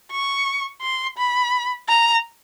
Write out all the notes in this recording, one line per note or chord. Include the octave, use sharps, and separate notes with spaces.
C#6
C6
B5
A#5